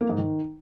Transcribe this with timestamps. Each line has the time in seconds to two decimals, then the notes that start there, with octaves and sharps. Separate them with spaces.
0.01 A#3
0.09 G#2
0.18 D#3